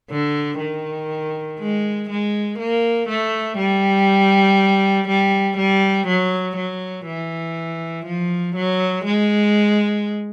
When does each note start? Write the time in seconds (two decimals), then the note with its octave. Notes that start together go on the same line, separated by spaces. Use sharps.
0.10 D3
0.59 D#3
1.59 G#3
2.10 G#3
2.59 A#3
3.08 A3
3.58 G3
5.08 G3
5.57 G3
6.07 F#3
6.57 F#3
7.06 E3
8.06 F3
8.56 F#3
9.05 G#3